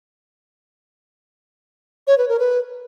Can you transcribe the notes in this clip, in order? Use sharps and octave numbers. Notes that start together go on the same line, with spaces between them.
C#5
B4
A#4
B4